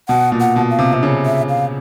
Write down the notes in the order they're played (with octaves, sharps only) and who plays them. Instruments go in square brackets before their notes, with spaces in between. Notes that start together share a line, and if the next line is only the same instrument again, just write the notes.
[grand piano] B2 [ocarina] F#5
[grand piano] A#2
[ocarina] F#5
[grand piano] B2
[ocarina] F5
[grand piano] C3
C3
C#3
[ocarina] E5
F5